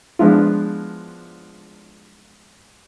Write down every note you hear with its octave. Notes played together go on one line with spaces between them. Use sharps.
F3 G#3 B3 D4 E4 F4